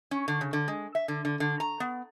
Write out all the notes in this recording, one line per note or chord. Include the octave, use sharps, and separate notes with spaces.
C#4
D3
C#3
D3
G#3
E5
D3
D3
D3
A#5
B3